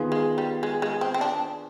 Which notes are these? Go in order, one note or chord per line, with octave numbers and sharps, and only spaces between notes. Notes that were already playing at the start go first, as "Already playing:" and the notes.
Already playing: D#3 B3 F4 G#4
G#3
G3
G#3
G#3
C4
C4
D4